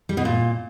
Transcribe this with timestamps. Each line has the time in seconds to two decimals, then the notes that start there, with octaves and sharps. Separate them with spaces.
0.09 G3
0.17 B2
0.25 A#2